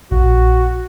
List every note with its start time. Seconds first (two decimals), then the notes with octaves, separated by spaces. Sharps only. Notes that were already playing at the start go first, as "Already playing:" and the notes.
0.11 A#1 F#4